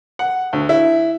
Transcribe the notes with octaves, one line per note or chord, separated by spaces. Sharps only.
F#5
D2
E4